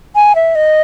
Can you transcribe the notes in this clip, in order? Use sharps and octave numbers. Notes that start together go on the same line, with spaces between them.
G#5
E5
D#5